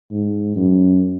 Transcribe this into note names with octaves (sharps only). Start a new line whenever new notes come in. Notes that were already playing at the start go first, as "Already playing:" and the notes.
G#2
F#2